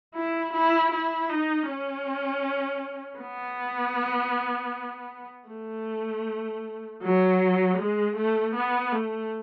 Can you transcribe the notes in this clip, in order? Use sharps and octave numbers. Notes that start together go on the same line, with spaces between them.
E4
E4
E4
D#4
C#4
B3
A3
F#3
G#3
A3
B3
A3